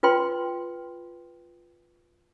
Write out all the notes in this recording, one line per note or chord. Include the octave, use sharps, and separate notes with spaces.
F4 B4 G5 C6